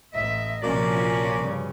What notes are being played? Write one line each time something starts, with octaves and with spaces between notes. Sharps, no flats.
A1 D#5 E5
A#1 C3 F3 A#3 C#4 F#4 D5
G2 C#3